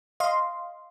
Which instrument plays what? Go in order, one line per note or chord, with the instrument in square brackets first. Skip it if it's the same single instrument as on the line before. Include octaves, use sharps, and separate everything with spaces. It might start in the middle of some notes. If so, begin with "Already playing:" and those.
[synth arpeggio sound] D#5 F5 C6